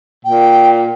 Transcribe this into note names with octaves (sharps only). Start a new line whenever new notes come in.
A#2 G5